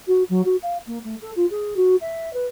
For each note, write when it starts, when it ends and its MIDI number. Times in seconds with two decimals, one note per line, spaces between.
0.07 0.23 66
0.29 0.41 54
0.45 0.56 66
0.62 0.77 77
0.86 0.98 58
1.04 1.15 57
1.21 1.31 69
1.36 1.45 65
1.50 1.74 68
1.76 1.95 66
2.00 2.32 76
2.33 2.46 71